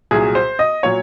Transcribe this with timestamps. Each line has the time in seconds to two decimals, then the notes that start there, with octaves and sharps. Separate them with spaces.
0.11 C2 A#2 F#3 G#4
0.35 C5
0.59 D#5
0.83 A#2 F#3 C#5